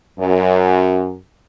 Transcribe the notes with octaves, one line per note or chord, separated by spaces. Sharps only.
F#2